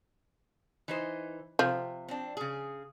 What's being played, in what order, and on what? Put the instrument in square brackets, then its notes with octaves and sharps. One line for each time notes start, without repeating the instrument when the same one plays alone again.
[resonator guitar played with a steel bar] E3 D#4 C5
[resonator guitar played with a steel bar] C3 [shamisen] F3
[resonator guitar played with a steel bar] C4 D4
C#3 G#4